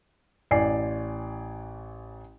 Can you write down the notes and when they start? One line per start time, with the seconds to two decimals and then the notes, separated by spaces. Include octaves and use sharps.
0.51 A1 D5 G#5 C7